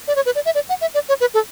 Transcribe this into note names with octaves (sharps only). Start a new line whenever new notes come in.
D5
C#5
B4
D5
E5
D5
F#5
E5
D5
C#5
B4
A4